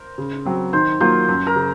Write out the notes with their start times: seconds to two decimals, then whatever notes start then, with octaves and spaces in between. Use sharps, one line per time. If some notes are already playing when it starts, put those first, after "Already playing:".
Already playing: A#4 C5
0.18 C#3
0.45 F#3 C4
0.73 D#3 C5
1.00 F#3 A#3 F4 C5
1.29 F#2
1.46 A#4
1.55 C#3